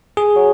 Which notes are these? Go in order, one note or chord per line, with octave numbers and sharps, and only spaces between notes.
G#4
F#3